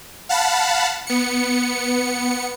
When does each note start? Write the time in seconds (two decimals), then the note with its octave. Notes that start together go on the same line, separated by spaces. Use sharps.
0.29 F5 F#5 A5 B5
1.07 B3 C#7